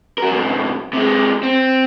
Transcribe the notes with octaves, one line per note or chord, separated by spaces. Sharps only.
F#4 A#4
F2 B2
C3 G#3
C4